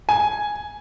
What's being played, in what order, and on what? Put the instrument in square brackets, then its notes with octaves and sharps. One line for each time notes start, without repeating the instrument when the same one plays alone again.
[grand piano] G#5